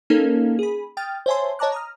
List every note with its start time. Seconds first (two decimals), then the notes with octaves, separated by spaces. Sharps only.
0.10 A#3 C#4 D#4 A4 A#4 F5
0.59 G#4 B5
0.97 G5 D#6 F6 A6
1.26 C5 C#5 E5 G#5 A5 C6
1.59 C#5 D#5 A5 A#5 D6 F#6
1.72 A#5 D#6 F6